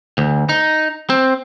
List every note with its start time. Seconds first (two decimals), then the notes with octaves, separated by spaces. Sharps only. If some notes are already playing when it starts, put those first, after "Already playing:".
0.18 D2
0.49 D#4
1.10 C4